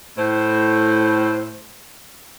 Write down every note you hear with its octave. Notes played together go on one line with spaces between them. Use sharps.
A2 C5